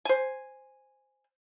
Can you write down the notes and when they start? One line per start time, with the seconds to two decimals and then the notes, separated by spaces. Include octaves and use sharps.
0.05 C5 G#5